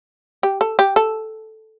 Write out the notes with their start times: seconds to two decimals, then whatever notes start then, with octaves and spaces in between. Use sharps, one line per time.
0.43 G4
0.61 A4
0.79 G4
0.96 A4